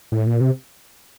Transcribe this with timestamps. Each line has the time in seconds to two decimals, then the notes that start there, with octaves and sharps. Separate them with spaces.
0.12 A2
0.27 A#2
0.41 C3